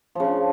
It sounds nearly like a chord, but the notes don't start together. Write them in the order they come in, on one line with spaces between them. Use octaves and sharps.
F3 C#3 D4